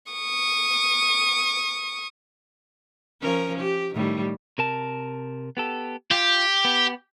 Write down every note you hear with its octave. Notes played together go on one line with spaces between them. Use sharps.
C#6 D#6
F3 C#4 A#4
G4
A2 D#3 G3
C3 A#4 A5
B3 G4 A4
F4 G4
B3